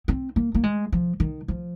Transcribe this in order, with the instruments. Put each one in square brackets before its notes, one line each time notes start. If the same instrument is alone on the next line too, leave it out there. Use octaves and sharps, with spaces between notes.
[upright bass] C4
A#3
A#3
G#3
F3
D#3
F3